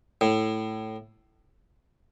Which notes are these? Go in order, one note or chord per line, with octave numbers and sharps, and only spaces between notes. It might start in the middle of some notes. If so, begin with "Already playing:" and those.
A2